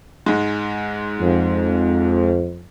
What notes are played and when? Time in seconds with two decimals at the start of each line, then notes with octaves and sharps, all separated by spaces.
0.26 G#2 G#3
1.20 F2